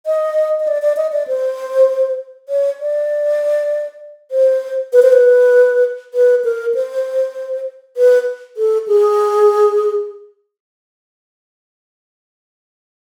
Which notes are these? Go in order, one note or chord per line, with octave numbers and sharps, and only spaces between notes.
D#5
D#5
D5
D5
D#5
D5
C5
C#5
D5
C5
B4
C5
B4
B4
A#4
C5
B4
A4
G#4